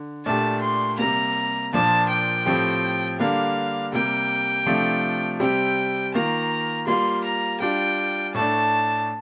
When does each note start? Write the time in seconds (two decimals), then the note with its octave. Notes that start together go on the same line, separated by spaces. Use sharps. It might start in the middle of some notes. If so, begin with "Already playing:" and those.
Already playing: D3
0.25 A#2 A3 D4 G4 A5
0.62 C6
0.99 C3 G3 A#3 A#5
1.73 A#2 F3 A#3 D4 A5
2.09 G5
2.46 A2 F3 C4 G4
3.19 D3 G3 A#3 D4 F5
3.93 C3 G3 A#3 G5
4.66 C3 F3 A3 D4 F4
5.40 C3 G3 C4 G4 G5
6.14 D#3 A#3 F4 A#5
6.87 G3 A#3 F4 C6
7.24 A#5
7.60 G3 D4 F4 G5
8.34 A2 A3 D4 A5